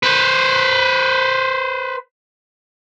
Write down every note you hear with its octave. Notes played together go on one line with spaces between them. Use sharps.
B4 C5